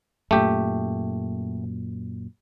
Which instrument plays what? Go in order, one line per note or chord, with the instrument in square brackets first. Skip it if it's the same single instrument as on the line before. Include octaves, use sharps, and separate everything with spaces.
[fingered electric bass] F#2 A#2 [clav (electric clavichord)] A3 G4